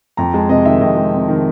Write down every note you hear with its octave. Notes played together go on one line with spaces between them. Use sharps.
F2 A#5
G#3 A5
C3 D#5
D#3 E5
F2 D#5
G#3
C3
D#3